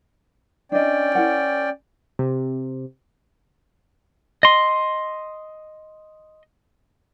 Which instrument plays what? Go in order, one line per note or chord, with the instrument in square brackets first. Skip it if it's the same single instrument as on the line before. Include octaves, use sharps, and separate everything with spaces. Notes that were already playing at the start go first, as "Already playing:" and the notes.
[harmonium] C#4 D5 G5 [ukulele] D4 D#5
[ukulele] E4 A#4 F#5
[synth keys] C3
[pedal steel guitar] D#5 C6